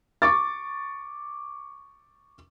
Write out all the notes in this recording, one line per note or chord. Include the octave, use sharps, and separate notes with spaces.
C#6 D6 A6